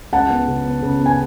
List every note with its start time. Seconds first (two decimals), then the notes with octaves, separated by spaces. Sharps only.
0.13 C#2 F#5 A5
0.30 B3
0.48 C#3
0.65 B3
0.82 C#3
1.00 B3
1.06 G#5